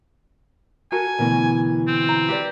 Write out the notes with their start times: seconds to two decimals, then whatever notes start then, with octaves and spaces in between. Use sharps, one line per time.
0.92 F#4 A4 A#4 G#5
1.18 D2 B2 E3 A#4
1.88 C4
2.09 A#5
2.29 G4 B4 D5